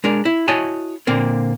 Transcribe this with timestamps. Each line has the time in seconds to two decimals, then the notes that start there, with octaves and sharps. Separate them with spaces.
0.04 G#3 D4 A#4
0.25 E4
0.48 E4 F#4 C#5 D#5 G#5 A5
1.07 A#2 D3 A#3 C4